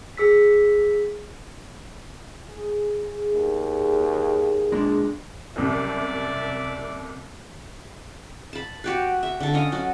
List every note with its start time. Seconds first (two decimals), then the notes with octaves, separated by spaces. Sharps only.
0.17 G#4 E6 B6
2.49 G#4
3.33 D#2
4.72 A#2 G#3 D4
5.56 F#1 C2 C3 D5 E5
8.53 A5 B5
8.84 F#4 G4 B4
9.23 E5
9.40 D3 A4
9.53 C#4 C#5 D#5 F5
9.72 F#3 F#4